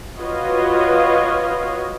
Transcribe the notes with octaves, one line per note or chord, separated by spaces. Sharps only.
F4 F#4 B4 C#5 D#5 F5